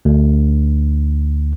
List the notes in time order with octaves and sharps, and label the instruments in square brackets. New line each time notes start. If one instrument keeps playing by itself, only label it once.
[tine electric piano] D2